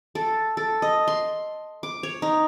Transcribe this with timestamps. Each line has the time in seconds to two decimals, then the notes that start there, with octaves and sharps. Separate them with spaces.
0.15 A4
0.57 A4
0.82 D#5
1.08 C6
1.83 D6
2.03 C#5
2.22 D#4